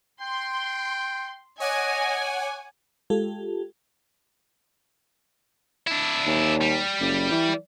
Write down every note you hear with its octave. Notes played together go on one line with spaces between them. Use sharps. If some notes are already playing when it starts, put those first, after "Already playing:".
G5 C6
C#5 D#5 F#5 G#5 D6
G#3 F4 G4 A4
D4 E4
D#2
G3
F#1
E3